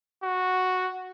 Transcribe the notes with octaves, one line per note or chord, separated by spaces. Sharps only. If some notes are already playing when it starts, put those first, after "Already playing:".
F#4